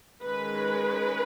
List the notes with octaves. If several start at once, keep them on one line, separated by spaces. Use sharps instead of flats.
D#3 G#3 C#4 B4